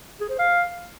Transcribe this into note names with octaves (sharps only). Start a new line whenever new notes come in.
G#4
C5
F5